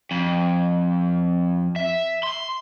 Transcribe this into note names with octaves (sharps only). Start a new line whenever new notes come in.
F2
E5
C6